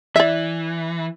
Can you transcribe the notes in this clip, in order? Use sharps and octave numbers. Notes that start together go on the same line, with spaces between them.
E3 D5 E5